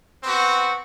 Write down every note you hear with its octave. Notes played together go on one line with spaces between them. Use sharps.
B3 C4 F#4